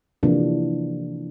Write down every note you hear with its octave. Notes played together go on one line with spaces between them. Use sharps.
C3 E3 F3 A#3 D4